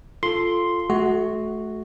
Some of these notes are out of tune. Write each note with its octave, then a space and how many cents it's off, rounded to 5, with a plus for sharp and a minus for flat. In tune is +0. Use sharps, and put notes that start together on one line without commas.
F4 -5 A4 +0 C6 +0
A3 -30 F#4 +0